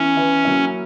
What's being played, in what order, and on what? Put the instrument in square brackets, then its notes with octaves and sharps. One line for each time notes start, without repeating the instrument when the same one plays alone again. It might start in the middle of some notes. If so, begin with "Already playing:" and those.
Already playing: [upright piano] E3 B3 E4 [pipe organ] C#4
[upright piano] E3 B3 E4
F#3 A#3 E4